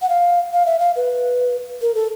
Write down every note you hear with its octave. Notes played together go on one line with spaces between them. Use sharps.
F#5
F5
F5
E5
F5
B4
A#4
A4